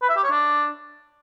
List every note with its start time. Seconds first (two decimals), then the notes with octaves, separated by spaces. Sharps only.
0.02 B4
0.09 E5
0.17 G4
0.24 C#5
0.31 D4